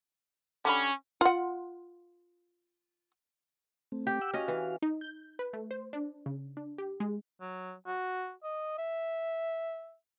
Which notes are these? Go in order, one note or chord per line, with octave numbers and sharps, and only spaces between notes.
D3 G3 C#4 B5
F4 F#5
A3 C4
G4
F#5 G5 E6
C#4 F#4 D#5 F5
E3
D#4
G6
B4
A3
C5
D4
C#3
D4
G4
G#3
F#3
F#4
D#5
E5